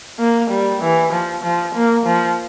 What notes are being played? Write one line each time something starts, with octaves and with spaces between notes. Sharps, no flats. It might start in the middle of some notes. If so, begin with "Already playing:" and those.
A#3
G3
E3
F3
F3
A#3
F3